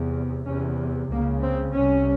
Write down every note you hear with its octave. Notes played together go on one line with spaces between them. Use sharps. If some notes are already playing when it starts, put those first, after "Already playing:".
Already playing: E2 C3
E2 C3 C#4
C#2 C#3 A#3
C4
C2 C3 C#4